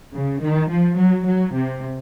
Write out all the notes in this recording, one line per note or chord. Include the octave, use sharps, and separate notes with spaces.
C#3
D#3
F3
F#3
F#3
C3